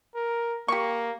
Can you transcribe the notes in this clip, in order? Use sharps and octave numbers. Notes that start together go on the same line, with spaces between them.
A#4
A#3 G4 C#6